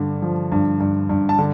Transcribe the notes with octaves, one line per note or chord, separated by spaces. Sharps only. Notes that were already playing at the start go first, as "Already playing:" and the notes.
Already playing: G2 D3
F3
G2
G2
G2
A5
D3